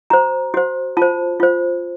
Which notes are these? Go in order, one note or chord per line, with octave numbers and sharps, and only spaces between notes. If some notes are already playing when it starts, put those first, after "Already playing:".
F#4 C5 A#5
F#4 C5
F4 C5 A5
F4 C5